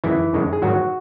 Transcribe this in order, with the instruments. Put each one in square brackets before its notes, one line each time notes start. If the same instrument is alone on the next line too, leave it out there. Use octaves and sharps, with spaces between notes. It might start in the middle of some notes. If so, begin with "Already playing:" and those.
[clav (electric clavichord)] F#2 D#3 E3 G#3 E4
F#2 D#3 G#3
G#4
G#2 D#3 F#3 F#4